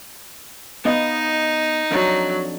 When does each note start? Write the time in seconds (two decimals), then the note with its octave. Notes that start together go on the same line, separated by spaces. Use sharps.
0.85 B3 D#4 D#5 F5
1.91 F2 F#3 D4 A#5